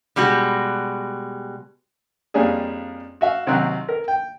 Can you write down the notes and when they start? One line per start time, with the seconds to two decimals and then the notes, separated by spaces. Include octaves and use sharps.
0.16 B2 G3 G#3 F#4
2.34 F2 G3 A#3 C#4 D4 G#4
3.21 F#4 E5 F5
3.47 C2 D#3 F#3 C4 F#4 F#6
3.89 A#4
4.08 G5